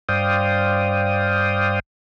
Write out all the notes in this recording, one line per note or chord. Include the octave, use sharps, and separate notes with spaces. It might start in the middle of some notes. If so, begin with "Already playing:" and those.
G2 C5 D5 F5 G5 D#6